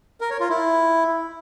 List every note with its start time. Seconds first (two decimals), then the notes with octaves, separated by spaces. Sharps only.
0.21 A#4
0.30 C#5
0.40 F4
0.50 E4